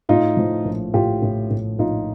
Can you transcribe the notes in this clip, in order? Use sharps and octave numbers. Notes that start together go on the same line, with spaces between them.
A2 D#4 F4
F3
A#1
A2 F4 G4
A2
A2
A#1 D#4 F4